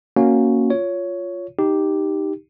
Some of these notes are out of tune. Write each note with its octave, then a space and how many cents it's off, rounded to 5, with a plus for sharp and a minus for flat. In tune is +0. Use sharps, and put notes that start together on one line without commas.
A#3 +0 C#4 +0 F#4 -5
F4 +0 C#5 +10
D#4 +0 G4 +0